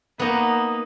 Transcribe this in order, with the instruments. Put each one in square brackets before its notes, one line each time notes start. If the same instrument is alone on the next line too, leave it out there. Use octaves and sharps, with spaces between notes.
[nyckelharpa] A#3 [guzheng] B3 D#4